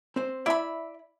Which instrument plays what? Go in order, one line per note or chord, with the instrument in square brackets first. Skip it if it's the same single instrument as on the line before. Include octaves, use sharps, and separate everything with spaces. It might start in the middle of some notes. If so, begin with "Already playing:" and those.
[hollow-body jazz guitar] C4 C5
[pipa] E4 B5 [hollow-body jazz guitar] D5 E5